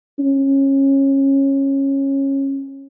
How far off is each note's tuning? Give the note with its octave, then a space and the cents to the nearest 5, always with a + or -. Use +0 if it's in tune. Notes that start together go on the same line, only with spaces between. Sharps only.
C#4 -20